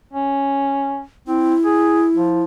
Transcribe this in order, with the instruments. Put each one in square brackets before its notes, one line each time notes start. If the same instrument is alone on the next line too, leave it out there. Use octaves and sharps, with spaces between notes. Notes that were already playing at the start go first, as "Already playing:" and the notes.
[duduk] C#4
[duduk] C4 [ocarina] E4
[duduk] G#4
F3